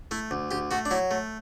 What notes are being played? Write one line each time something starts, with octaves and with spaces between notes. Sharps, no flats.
A3 E4
D2
D2 G4
A3 F#4
D4
F#3 E4
A3